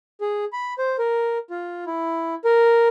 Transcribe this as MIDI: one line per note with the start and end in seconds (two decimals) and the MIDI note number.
0.21 0.45 68
0.53 0.74 83
0.78 0.96 72
0.99 1.38 70
1.50 1.84 65
1.87 2.35 64
2.45 2.88 70